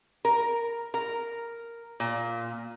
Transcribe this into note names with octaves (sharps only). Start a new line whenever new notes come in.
A#4
A#4
A#2